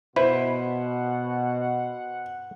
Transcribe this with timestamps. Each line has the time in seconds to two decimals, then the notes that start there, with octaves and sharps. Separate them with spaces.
0.16 B2 E4 B4 C5 F#5